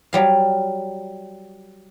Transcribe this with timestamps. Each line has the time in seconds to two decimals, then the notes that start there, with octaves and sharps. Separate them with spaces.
0.13 F#3 G3 F5